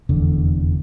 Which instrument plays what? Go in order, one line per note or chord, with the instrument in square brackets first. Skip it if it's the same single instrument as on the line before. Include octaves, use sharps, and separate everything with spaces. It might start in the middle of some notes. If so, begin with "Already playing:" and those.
[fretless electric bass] F1 E2 D3